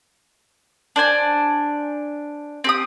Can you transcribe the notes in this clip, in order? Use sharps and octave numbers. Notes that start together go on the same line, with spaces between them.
D4 C5 G#5
C4 G4 D#6